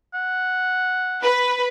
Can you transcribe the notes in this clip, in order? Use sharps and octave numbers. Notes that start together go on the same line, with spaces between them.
F#5
B4